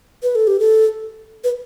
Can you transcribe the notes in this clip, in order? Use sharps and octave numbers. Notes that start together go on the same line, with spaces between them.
B4
A4
G4
A4
B4